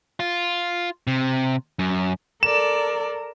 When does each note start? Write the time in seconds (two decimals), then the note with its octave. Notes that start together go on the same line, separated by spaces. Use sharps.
0.20 F4
1.07 C3
1.79 F#2
2.43 A4 A#4 D5 E7